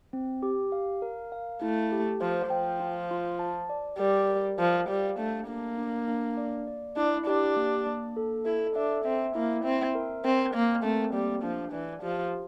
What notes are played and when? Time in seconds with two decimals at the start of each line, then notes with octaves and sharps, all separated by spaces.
0.13 C4
0.43 G4
0.72 F5
1.02 A#4
1.32 F5
1.61 A3 E4
1.92 G4
2.21 F3 C5
2.50 F3 G5
2.80 F4
3.11 F4
3.39 A5
3.69 D5
3.99 G3 A#4
4.29 A#4
4.59 F3 A#4
4.88 G3 F5
5.18 A3 D4
5.49 A#3 D4
5.78 D4
6.08 D4
6.37 D5
6.67 D5
6.96 D4 E4
7.26 D4 G4
7.56 A#3
7.86 A#3
8.17 A4
8.46 E4 A4
8.76 D4 E5
9.05 C4 E5
9.35 A#3 E4
9.64 C4 E5
9.95 A#4
10.24 C4 A#4
10.54 A#3 A#4
10.84 A3 C4
11.13 G3 A#3
11.43 F3 D4
11.72 E3 D5
12.02 F3 G4